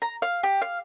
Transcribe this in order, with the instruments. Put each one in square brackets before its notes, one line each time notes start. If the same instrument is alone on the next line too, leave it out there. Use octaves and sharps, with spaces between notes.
[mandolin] A#5
F5
G4
F5